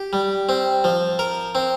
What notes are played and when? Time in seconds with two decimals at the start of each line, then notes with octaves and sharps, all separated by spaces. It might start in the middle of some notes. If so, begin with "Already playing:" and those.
Already playing: G4
0.13 G3
0.49 C4
0.84 F3
1.19 A#4
1.55 C4